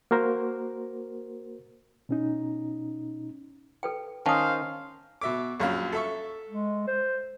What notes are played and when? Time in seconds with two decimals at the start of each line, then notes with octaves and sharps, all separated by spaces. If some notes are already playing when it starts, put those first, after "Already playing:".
0.11 A#3 F#4 A#4 C5
2.09 B2 C#4 D#4
3.83 A4 B4 G5
4.26 D#3 C#4 C5 F5 A5 D#6
5.21 B2 E5 D6
5.60 A#1 F#2 F5
5.92 A4 E5 C#6
6.48 G#3
6.88 C5